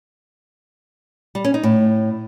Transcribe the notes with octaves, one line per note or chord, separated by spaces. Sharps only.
G3
C#4
D#4
A2